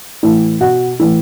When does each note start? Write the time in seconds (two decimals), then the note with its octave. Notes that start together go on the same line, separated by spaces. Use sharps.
0.23 A2 E3
0.60 B2 F#5
0.99 A2 E3